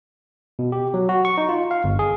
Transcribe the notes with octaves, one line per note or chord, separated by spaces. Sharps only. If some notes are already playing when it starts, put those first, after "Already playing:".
B2
G4
F#3
F#4
C#6
D#4
F4
F5
G1
G#4